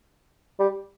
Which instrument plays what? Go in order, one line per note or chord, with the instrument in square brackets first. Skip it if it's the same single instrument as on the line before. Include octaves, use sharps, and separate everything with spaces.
[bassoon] G3